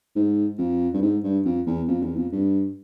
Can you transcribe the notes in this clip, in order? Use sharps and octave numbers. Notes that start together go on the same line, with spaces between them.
G#2
F2
G2
G#2
G2
F2
E2
F2
E2
F2
G2